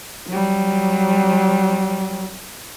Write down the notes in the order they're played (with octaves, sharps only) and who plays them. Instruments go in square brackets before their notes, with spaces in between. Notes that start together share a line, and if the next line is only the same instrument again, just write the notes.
[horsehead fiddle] F#3 G3